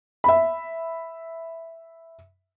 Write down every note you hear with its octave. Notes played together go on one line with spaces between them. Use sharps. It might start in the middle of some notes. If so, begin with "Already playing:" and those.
E5 B5